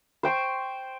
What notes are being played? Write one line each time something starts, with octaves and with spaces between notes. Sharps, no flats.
C5 G5 C6 C#6